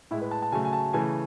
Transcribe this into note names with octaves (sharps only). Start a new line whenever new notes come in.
A2 G#3 E4
B4
A5
A5
C#3 F#3 A3 G#5
G#5
A5
C#3 E3 A3 G#5